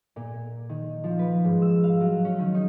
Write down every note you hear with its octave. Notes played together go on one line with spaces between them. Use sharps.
A#2
D#3
F3
B4
G#2
E6
F5
F#3
C#4
D#3
D#4